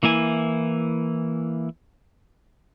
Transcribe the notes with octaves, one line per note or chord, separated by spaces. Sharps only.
E3 A#3 E4 G#5